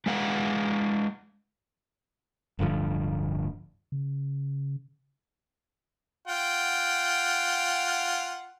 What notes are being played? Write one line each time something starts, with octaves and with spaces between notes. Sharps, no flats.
G#3 B4 D5 F5 F#5
D1 G2 D3 F3
C#3
F4 F#5 G5